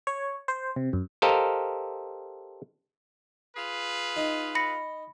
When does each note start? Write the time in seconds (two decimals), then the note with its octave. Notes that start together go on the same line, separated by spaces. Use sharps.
0.07 C#5
0.48 C5
0.76 C3
0.93 F#2
1.22 G4 A4 A#4 C5 D#5 F5
3.55 F4 G#4 B4
4.16 D#4
4.55 B5 A#6 C#7